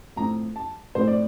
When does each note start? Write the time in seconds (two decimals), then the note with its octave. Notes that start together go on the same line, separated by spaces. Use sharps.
0.16 A2 F3 C4 A#5
0.56 A5
0.95 A2 F3 C4 C5
1.07 D5